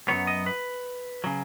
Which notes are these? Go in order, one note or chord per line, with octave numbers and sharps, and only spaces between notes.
F#2 D#3 F#3 B3 C#5
D#5
B4
C#3 F#3